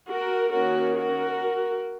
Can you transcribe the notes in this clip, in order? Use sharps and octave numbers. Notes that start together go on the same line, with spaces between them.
F#4 A#4
D#3 A#3 C#4 F#4 A#4
F#4 A#4